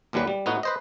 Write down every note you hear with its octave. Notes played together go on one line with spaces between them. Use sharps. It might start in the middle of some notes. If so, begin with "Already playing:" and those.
A#1 D#2 F#3 G3 B4
G3
A2 B3 D#4 F#4
B4 C5 D#5